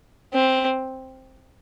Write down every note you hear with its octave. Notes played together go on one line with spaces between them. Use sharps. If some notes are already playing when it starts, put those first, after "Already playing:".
C4